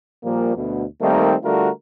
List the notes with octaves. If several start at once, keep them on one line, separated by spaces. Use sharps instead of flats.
A#2 F3 G3 A#3
D2 B2
D#3 G3 A3 A#3 C4 D#4
D3 G3 A3 F4 F#4 A#4